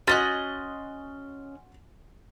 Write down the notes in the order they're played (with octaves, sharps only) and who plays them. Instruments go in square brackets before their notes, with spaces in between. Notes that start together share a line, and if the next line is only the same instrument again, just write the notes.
[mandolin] C#4 D#5 F#6 [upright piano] F#4 C6 A6